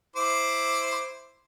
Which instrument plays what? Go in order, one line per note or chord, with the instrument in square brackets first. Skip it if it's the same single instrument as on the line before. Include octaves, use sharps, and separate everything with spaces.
[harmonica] E4 C5 D6